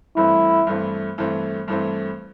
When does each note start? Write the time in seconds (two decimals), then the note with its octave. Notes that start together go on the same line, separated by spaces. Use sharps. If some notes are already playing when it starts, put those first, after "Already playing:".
0.16 G2 E3 A3 C4 E4
0.67 G2 E3 A3 C4
1.18 G2 E3 A3 C4
1.68 G2 E3 A3 C4